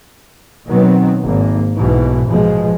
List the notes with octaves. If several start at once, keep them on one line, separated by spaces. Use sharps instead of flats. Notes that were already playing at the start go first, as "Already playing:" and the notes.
B2 D#3 F#3 B3 C4
G#1 A#3
B1 G#2 B2 E3
A#1 B2 F3 G#3